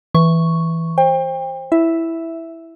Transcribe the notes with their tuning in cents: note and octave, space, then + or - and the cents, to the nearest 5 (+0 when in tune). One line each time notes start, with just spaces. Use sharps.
E3 +0 C#6 +0
C5 +20 G5 +30
E4 +0 E5 +0